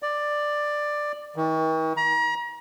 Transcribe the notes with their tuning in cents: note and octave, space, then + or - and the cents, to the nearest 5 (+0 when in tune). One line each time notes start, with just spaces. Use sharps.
D5 +10
D#3 +45
A#5 +35